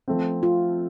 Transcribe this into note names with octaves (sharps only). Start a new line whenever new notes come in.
F3 A3 C4
F4